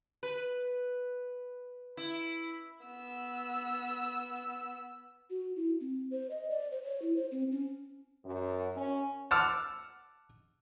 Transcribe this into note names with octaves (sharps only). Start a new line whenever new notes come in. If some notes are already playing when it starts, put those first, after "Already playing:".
B4
E4
B3 E6
F#4
E4
C4
C5
D#5
D5
C5
C#5
E4
C5
C4
C#4
F#2
C#4
F#5 A5 D6 E6 F6